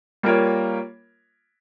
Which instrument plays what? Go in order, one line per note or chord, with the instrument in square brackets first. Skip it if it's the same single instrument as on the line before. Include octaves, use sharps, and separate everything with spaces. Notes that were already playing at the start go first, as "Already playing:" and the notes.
[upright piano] G3 A#3 F4 A#4 C#5